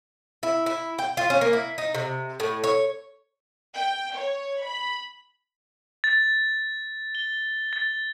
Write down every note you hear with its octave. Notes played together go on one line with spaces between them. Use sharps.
E4
E4
G5
F4
C#4
A#3
E4
D#4
C3
A2
C#5
G5
C#5
B5
A6
G7
A6